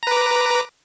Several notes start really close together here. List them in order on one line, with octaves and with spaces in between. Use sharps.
A#5 B4 D6